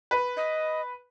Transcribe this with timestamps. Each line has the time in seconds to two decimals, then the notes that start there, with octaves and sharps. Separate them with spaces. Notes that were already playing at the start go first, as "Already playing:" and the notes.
0.11 B4
0.37 D#5